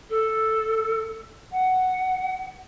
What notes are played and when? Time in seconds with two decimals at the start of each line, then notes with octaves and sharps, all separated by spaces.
0.09 A4
1.51 F#5